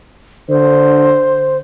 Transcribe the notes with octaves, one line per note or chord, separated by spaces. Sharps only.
D3 C5